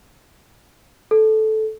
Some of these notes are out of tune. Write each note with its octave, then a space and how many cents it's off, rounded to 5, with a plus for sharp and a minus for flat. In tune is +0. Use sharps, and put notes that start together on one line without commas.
A4 -10